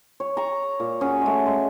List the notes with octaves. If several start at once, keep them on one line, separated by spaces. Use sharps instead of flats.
C#5
A#5 C#6
A#2
C#4 F#4 G#4
G#3 A3
G#3